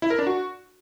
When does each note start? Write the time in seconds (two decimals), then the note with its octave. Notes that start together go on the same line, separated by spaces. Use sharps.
0.02 E4
0.10 A#4
0.19 D4
0.27 F#4